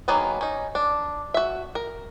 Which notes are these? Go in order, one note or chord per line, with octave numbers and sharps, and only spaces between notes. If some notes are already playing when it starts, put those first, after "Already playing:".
D#3 F#3 A#3 B3 G#4
C#4 D#4
D4
F#4 E5
A#4